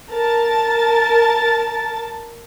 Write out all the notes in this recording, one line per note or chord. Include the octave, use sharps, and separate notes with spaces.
A#4 A5 A6